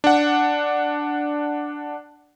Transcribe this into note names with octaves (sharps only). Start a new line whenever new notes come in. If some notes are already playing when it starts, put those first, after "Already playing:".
D4 F#5